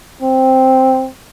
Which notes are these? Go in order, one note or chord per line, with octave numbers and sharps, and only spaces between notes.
C4